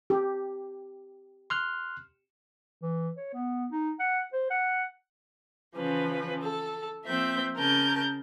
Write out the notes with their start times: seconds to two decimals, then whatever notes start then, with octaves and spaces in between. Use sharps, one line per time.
0.10 G4
1.50 C6 F6 F#6
2.81 E3
3.17 C#5
3.33 B3
3.72 D#4
4.00 F#5
4.33 C5
4.50 F#5
5.75 C#3 E3 F3 C#4 B4
6.42 A4
7.05 F3 A#3 C4 E5 G6
7.56 C#3 A#4 A5 G6